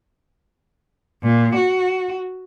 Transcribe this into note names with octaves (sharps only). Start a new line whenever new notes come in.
A#2
F#4